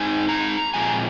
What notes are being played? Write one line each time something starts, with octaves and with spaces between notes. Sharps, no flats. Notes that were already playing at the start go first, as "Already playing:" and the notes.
Already playing: G#3 C4 D#4 G#5
A#5
A#2 F3 G#3 C4 G#5